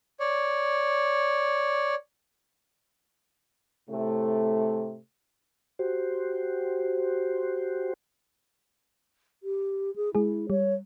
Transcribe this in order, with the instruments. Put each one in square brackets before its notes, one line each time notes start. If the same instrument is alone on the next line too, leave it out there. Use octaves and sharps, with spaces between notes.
[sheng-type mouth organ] C#5 D5
[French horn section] A2 C3 A3
[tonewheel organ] F#4 G4 C5
[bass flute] G4
G#4
[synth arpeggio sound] G#3 G#4 [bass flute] E4
[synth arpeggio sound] G3 [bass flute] C#5